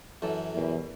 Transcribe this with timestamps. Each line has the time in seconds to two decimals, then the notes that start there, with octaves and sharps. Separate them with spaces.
0.22 F#2 E3 A4
0.54 E2 B2 G3 A#4